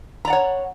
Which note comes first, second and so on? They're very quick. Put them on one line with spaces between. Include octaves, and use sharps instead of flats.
A#5 D5 F#5 C#5